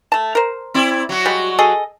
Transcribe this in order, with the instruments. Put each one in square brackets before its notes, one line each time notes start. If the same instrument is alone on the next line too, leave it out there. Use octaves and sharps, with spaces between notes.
[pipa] A3 A5
A#4 C5
[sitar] C4 E4 D5
F#3 F#4
[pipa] G3 G#3
G#4 A4 D#5